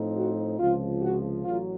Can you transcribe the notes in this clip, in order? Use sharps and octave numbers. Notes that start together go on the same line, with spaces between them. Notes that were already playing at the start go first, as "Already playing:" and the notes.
Already playing: A2 F3 C4 D#4
F#4
C#2 C3 F3 F4
F#4
A1 A2 F#3 F4